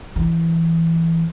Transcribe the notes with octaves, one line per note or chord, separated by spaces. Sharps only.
E3